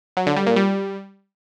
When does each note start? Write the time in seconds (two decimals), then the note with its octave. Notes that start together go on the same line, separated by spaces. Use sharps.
0.17 F#3
0.27 D3
0.36 G3
0.46 A#2
0.56 G3